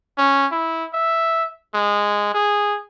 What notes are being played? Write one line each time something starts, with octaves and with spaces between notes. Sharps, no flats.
C#4
E4
E5
G#3
G#4